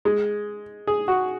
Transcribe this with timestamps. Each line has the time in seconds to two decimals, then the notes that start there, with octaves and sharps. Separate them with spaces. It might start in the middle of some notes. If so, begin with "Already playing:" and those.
0.05 G#3
0.87 G#4
1.08 F#4